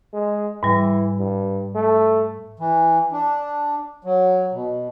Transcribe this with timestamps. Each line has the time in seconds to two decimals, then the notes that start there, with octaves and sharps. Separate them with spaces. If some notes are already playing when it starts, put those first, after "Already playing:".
0.13 G#3
0.63 G#2 E3 G3
1.19 G2
1.75 A3
2.59 E3
3.12 D4
4.04 F#3
4.52 B2